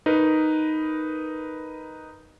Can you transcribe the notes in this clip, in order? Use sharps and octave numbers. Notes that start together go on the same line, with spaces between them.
D#4 A#4 B4